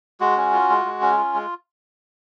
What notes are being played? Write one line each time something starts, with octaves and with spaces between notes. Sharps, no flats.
G#3 F#4
C#4
F4
G#3
G#3
C#4
F4
G#3